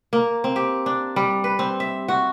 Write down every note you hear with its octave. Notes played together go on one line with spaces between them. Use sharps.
A#3
C4
G4
D4
G3
B4
C4
E5
F#4